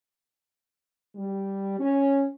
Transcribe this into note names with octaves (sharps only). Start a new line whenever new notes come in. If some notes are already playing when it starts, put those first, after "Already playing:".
G3
C#4